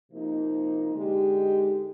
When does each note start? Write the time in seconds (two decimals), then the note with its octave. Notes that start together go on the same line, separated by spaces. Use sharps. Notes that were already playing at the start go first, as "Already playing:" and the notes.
0.11 C3 F3 A#3 D#4
0.93 D3 G#3 D#4 G4